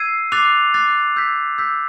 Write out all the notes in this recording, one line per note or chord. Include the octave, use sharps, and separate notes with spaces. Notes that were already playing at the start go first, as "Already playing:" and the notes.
Already playing: E6 G#6 C7 D#7
D6 F#6 A6 C7 F7
D6 F#6 A6 C7 F7
E6 G6 B6
E6 G6 B6